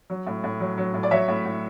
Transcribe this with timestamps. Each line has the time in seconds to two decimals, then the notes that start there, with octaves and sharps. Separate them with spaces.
0.10 F#3
0.27 A2
0.44 A2
0.60 F#3
0.78 F#3
0.94 A2
1.03 D5
1.11 F#3 C#5 E5
1.28 A2
1.45 A2